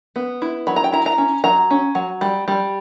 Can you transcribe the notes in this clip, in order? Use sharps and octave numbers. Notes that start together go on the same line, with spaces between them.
B3
E4
F#3 B5
A#5
G5
E4 A#5
A#5
C#4
F#3 A#5
C#4
F#3
G3
G3